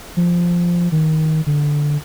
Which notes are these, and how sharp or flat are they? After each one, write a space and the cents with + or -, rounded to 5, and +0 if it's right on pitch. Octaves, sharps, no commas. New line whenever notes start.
F3 -5
D#3 +15
D3 +0